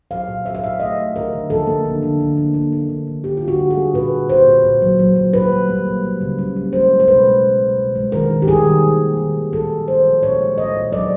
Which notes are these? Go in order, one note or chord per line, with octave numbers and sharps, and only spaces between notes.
F#3 F5
A#2
F#3 E5
F5
A#2 E5
A3 D#5
A3
D3 A#4
D3
F3 A4
A#3
D3
D3
D3
A#3
A#3
A#3
D3
D3
D3 G4
F4
D3
F#4
G3
G#4
A#3
A#2 B4
A#3
A#3 C5
A#2
A#2
F#3
F#3
F#3
A#3 B4
G3
A#3
G3
G3
C#3
G3
A#3
G#3 C5
G#3
C5
B2 B4
G#3
B2
B2
B2
G#3
D#3 A#4
D#3
G4
G3 G#4
D#3
A#3
D#3
D#3
D#3
A#2 A4
F3
F3 C5
F3
A#2 C#5
G#3
A#2 D#5
A#2
F#3 D5